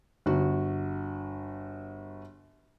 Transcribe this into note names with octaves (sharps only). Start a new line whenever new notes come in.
G1 F#4